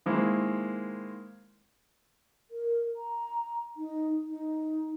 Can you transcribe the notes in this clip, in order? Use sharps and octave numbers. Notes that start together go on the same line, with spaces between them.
D#3 G#3 A#3 C4 E4
A#4
A#5
D#4
D#4